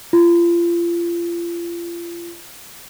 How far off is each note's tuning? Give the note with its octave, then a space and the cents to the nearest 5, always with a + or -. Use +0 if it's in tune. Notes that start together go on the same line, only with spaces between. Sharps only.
F4 -35